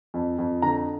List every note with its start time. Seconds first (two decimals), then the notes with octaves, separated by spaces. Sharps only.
0.14 F2
0.39 F2
0.62 D3 A#5